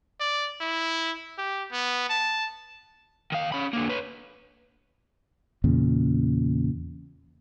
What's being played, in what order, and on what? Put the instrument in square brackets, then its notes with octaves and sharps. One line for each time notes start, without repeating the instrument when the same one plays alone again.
[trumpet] D5
E4
G4
B3
A5
[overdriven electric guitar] D#3 F5
C#4 B5
D3 A#3
B4 C#5
[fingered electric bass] E2 A#2 C#3